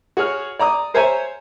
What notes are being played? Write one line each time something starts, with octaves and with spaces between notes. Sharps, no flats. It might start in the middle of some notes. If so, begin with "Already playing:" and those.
F#4 G#4 C#5 F6
D5 A#5 D6 D#6
A#4 C5 C#5 E5 G#5 A#5